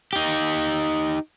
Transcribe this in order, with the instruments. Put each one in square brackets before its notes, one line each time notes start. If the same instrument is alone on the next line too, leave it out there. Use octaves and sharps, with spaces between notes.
[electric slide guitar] D#4 G4